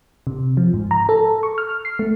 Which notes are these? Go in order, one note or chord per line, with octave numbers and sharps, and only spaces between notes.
C3
F3
G#2
A#5
A4
C#6
F6
C7
A3